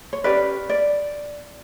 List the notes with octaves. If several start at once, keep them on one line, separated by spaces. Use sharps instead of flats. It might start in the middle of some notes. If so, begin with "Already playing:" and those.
C#5
C#4 G4 B4 D5
D5